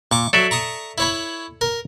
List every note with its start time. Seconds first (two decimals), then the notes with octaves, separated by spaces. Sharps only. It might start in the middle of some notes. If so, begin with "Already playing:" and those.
0.11 A#2 C#6 D6
0.33 F#3 A4 D5 E5
0.51 A#5 C#6 D#6
0.98 E4 C#5 B5
1.61 A#4